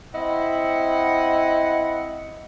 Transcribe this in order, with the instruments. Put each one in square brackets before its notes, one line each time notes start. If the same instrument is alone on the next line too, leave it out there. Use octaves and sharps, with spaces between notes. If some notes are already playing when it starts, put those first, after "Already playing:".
[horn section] C4 E4 D#5 F#5